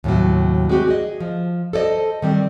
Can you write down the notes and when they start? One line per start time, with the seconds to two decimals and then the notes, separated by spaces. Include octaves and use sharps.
0.04 D#2 A2 C3 F#3
0.69 G#3 C4 F#4 G4
0.88 G#4 D#5
1.20 F3
1.73 A4 C5 D5 D#5
2.22 D#3 G3 C4